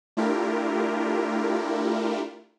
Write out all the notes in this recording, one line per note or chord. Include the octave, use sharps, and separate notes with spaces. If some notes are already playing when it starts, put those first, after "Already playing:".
A3 D4 E4 F4 G4 A#4